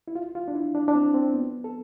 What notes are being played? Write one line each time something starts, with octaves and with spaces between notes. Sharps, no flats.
E4
F4
F4
D4
E4
D4
D4
C4
C4
B3
A4